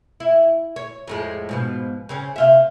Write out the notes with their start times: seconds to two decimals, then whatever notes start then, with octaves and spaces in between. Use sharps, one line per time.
0.20 E4
0.76 C#5
1.08 F2 A2 G#3
1.49 G#2 B2 F3
2.09 C#3 C4 C#4
2.36 C3 F4 E5